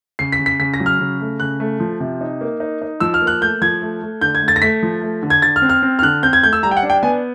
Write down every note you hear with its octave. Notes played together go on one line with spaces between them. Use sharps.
C#3 C7
B6
C#3
B6
C#3 B6
A#6
F#3
F6
C#3
A3
C#3 F#6
A3
F3
C3
D#4
A#3
D#4
D#4
F3 E6
F6
A#3
F#6
A3 G6
F3 G#6
A3
A3
D3 G6
G#6
A3
A6
A#6
A3 B6
F3
A3
D3
G#6
D3 A6
F6
C4
F6
C4
F6
D3 F#6
C4 G6
G#6
A3 G6
E6
G3 A#5
G5
F#5
D4
G5
B3 G#5